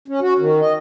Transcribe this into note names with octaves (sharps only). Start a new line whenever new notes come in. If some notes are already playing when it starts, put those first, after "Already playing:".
C#4
F#4
D#3
D#5